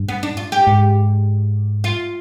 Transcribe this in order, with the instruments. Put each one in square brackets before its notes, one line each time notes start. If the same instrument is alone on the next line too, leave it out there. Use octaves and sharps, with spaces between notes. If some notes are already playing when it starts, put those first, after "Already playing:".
Already playing: [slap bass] G2
[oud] B3
D4
F4
G4
[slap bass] G#2
[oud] F4